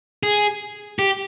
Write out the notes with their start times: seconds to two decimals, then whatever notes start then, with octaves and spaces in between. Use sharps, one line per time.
0.23 G#4
0.99 G4